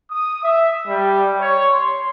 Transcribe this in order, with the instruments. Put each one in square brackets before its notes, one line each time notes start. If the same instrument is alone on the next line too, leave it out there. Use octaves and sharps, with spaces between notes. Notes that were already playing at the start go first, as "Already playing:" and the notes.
[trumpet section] D#6
E5
G3
C#5
C6